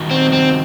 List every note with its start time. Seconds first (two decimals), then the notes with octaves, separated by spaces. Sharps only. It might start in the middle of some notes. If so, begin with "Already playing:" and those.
Already playing: D#3 G3 D#4 F#4
0.11 C4
0.33 C4